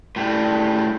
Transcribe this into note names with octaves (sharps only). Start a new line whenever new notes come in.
A2 G3